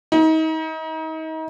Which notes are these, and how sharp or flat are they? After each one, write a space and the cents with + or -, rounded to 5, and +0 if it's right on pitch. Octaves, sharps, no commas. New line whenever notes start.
D#4 +35